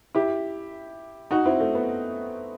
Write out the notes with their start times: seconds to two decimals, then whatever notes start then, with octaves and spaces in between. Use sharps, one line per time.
0.15 E4 G4
1.31 D#4 F#4
1.46 C4 E4
1.60 A3
1.75 B3